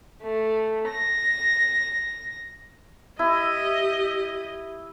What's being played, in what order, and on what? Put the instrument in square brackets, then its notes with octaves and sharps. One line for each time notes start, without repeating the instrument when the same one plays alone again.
[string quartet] A3
A#6
[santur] E4 [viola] G4 D#5